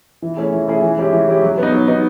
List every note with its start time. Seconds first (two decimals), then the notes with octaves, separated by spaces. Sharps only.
0.22 E3
0.37 A3 C#4 E4 G#4
0.53 E3
0.67 A3 C#4 E4 G#4
0.82 E3
0.97 G#3 C#4 E4 G4
1.13 E3
1.27 G#3 C#4 E4 G4
1.42 F#3
1.58 B3 D#4
1.72 F#3
1.87 B3 D#4